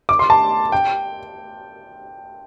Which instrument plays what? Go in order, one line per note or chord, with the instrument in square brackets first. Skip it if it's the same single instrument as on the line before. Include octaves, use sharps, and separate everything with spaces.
[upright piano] D6
C6
A5
G5